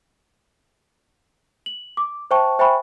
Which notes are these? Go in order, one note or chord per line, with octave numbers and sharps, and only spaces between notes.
F#7
D6
C5 E5 G5 A5 C#6
C5 E5 G5 G#5 B5 C#6